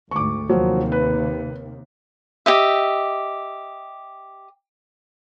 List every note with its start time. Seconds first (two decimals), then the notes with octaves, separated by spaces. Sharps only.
0.11 D2 G#2 C#6 D6
0.50 D#2 C3 F3 F#3
0.92 B4
2.46 G4 D#5 E5